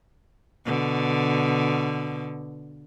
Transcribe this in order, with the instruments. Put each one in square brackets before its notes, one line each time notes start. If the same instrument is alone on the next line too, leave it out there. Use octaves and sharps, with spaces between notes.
[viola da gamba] B2 D3